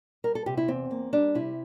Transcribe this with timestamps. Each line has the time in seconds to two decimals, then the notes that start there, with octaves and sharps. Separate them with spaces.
0.24 G3 A#4
0.35 A4
0.46 C3 G4
0.57 E4
0.68 E2 C4
0.91 A#3
1.13 G3 D4
1.35 C3 E4